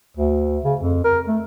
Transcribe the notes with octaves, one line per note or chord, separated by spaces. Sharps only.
D2
C#3
F2
A#4
A3